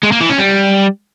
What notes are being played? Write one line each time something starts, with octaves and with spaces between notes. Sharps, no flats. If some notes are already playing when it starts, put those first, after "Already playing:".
G#3
A#3
E3
C#4
G3